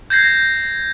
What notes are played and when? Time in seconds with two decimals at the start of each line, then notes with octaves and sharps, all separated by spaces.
0.10 G6 G#6 A#6 C7